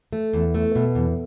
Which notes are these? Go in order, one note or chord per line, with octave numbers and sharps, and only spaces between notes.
A3
E2
A3
B2
E2